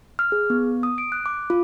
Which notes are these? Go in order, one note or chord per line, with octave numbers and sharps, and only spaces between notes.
F6
G#4
B3
D#6
D7
F#6
D6
F4